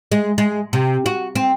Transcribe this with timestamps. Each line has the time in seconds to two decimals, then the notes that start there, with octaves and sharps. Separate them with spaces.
0.12 G#3
0.38 G#3
0.73 C3
1.06 F#4
1.36 C4